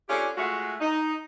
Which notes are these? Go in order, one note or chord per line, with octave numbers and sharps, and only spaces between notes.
C#4 D4 F4 G4 A4
G#3 A3 F4 F#4
D#4